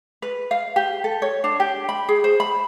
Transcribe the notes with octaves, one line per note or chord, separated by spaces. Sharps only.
B4
F5
G4
A4
C#5
D4
G4
B5
G#4
C5
B5